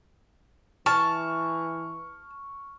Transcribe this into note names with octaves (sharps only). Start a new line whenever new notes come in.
E3 A5 C#6 F6